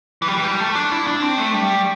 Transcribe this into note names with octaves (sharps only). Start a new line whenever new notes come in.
E3
G3
E3
G3
A3
D4
E4
D4
C4
A3
G3